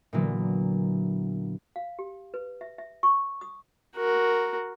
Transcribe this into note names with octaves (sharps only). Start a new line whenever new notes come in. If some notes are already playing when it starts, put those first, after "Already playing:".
A#2 D3 E3 F#3 A#3 B3
F5
G4
B4
E5
E5
C#6
D#6
F#4 A#4